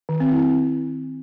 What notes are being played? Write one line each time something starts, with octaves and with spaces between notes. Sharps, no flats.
D#3
C4
E4